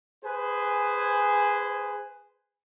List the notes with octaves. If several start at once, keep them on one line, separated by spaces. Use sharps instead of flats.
G#4 B4 C5 G#5